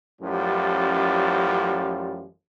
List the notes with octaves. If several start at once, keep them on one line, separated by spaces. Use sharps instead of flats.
A1 F#2 E3 F3 G3